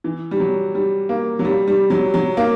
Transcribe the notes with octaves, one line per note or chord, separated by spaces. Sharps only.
E3
G3
F#3
G3
A#3
F#3
G3
G3
F#3
F#3
A#3